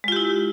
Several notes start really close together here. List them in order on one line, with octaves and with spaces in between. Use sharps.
G#3 F4 G4 E4